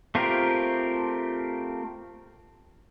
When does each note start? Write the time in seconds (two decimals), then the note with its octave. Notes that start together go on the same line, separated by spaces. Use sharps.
0.15 A3 C4 F4 G4 A#4